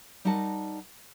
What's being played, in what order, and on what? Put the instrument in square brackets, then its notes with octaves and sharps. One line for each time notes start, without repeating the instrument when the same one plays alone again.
[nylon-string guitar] G3 D#4 A#4 F#5 A5